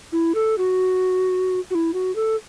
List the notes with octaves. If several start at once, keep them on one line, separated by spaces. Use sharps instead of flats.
E4
A4
F#4
F#4
E4
F#4
A4